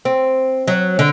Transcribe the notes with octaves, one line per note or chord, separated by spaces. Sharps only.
C4
F#3
D3